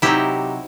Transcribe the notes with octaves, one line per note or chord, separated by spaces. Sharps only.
C3 F#3 C4 D#4 E4 G4